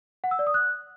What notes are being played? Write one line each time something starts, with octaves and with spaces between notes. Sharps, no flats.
F#5
E6
D5
D#6
F#6